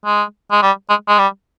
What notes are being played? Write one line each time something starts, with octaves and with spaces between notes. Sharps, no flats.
G#3
G#3
G3
G#3
G#3
G3